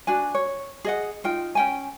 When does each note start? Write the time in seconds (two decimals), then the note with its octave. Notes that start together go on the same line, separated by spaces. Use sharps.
0.07 D4 F#4 G#5
0.35 C#5
0.85 G#4 D#5 F#5
1.24 D#4 F4 G5
1.55 C#4 G5 G#5